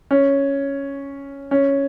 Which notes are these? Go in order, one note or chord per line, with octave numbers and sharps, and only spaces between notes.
C#4
C#4